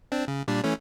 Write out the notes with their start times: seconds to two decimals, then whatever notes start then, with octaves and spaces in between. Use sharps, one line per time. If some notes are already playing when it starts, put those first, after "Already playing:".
0.12 C4 D4
0.28 C#3
0.48 A#2 G3 D4
0.64 E3 A3 C#4